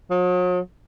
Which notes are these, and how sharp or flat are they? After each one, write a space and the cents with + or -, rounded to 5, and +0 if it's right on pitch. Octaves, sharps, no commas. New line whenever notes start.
F#3 -45